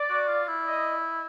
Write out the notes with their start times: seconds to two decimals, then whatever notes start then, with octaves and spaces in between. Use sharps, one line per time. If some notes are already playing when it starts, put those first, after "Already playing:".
Already playing: D5
0.10 F#4
0.28 F4
0.48 E4
0.67 D#5